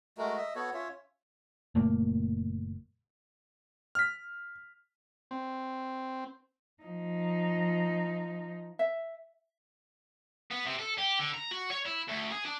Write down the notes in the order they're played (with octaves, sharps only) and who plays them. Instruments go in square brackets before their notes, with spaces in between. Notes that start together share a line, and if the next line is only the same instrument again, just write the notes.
[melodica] G#3 A3 F#4 A#4
D#5 E5
B3 F#4 A4 C#5
C#4 F4 C#5 E5
[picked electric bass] F#1 A#2 A3 A#3
[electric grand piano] F6 B6
[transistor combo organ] C4
[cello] F3 D#4
[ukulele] E5
[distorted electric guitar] B3
C3
A4
G4
D3
A#5
F#4
C#5
E4
D2
G#4
D4